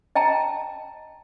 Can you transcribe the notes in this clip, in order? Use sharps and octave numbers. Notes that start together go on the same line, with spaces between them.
D#5 G5 A5 A#5